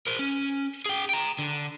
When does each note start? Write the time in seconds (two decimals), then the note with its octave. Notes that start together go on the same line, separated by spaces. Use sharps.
0.07 A#4 C5
0.19 C#4
0.86 G#4 G5
1.09 G5 A#5
1.39 D3